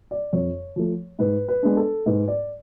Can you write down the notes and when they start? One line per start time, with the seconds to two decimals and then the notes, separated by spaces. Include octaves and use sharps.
0.11 D5
0.33 F2 C#5
0.76 F3 A3
1.19 G#2 B4
1.48 B4
1.63 G#3 B3 D4
1.77 A4
2.06 G#2 B4
2.28 D5